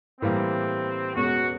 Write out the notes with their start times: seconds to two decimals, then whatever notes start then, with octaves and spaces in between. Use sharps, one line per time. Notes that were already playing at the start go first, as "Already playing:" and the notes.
0.21 A2 E3 G3 A#3 C4
1.16 E1 E2 B2 G#3 C#4 F#4